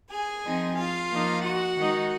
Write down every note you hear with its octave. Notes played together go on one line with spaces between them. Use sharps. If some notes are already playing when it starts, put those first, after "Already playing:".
G#4 G#5
F3 C4 D#4
F4 F5
F3 A#3 D#4
F#4 F#5
D#3 G#3 D#4